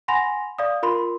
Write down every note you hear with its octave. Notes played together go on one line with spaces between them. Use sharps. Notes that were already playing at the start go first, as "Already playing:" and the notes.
F#5 G#5 B5 C6 A#6 F7
D5 F5 D#6
F4 A#4 B5 C6